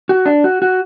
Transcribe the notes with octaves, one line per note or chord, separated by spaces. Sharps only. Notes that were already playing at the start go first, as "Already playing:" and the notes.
F#4
D4
F#4
F#4